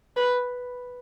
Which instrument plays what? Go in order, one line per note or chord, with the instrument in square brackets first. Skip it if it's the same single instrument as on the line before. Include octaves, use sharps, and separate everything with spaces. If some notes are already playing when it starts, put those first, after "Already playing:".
[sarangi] B4